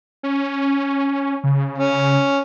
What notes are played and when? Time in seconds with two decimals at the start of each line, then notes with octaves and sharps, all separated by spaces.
0.23 C#4
1.44 C#3
1.78 C#4